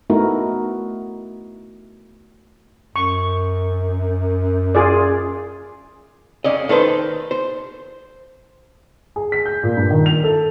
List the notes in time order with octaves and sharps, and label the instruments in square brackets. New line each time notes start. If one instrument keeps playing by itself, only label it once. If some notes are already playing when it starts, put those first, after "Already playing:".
[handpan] A3 B3 D#4 E4 F#4 A#4
[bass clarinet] F#2 [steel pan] C#6
[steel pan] F4 G#4 D5
[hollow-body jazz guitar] F2 C#4 D5 D#5
D#3 A4 B4 C5
C5
[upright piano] G#4
B6
G6
A#2
G2
D#3
F7
A4